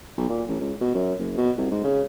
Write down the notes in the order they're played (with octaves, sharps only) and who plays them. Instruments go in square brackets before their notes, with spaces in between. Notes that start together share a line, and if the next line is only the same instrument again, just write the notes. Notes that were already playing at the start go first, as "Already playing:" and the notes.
[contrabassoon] B1
A#2
A1
C#2
B2
F#2
F#1
B2
C2
G#2
C#3